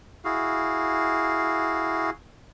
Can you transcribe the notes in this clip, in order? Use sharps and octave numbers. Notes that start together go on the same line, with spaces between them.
E4 F#4 G#4 F5